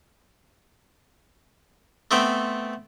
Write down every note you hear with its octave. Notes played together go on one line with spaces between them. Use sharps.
A3 B3 C4 G5